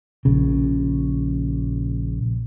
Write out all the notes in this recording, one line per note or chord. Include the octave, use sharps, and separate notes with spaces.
A#1 C#3